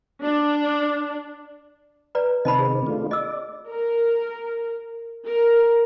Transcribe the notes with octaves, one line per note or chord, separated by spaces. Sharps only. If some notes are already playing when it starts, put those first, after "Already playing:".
D4
B4 D5 A#5
C3 D#3 C4 D#5 A5 B5
G#4
A3 D4 F4
D5 D#5 E6
A#4
A#4